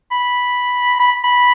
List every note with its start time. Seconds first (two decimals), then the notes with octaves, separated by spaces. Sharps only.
0.11 B5
1.00 B5
1.24 B5